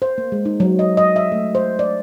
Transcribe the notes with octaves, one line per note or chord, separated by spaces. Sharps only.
C5
A#3
G#3
D#4
F#3
D#5
D#5
E5
A3
C5
D5